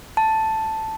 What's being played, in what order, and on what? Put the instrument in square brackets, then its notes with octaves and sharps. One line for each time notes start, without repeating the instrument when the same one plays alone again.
[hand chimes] A5